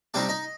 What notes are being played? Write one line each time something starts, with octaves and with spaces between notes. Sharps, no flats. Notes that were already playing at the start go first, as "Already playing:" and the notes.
C3 G3 C4 D4 D#4 D5
D#4 D#5